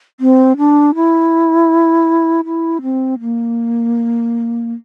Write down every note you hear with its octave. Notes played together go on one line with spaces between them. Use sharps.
C4
D4
E4
E4
C4
A#3